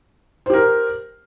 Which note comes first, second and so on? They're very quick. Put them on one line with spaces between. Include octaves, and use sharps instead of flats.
C5 G4 A#4